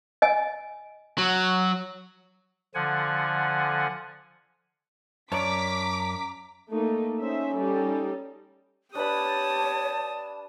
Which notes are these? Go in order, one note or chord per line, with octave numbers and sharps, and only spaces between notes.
D#5 G#5
F#3
D3 F3 F#5 G#5
F#2 C#5 D5 A5 A#5 D6 B6
A3 A#3 D#4
C#4 D#4 C5 E5
G3 D#4 A4
D4 G4 B4 C#5 A5 B5 D#6